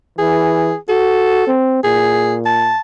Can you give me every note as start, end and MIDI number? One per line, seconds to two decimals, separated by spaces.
0.19 0.73 52
0.19 0.76 68
0.89 1.42 66
0.89 1.53 69
1.47 1.79 60
1.84 2.75 46
1.84 2.35 68
2.46 2.81 81